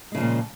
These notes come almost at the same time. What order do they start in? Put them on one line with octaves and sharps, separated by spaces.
G#3 C#3 F3 A#2